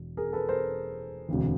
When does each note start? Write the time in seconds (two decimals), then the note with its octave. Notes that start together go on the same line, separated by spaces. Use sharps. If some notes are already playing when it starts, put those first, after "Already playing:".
Already playing: E1
0.17 G#4 A#4
0.33 A4 B4
0.49 A#4 C5
1.28 E1 D2 C3 E3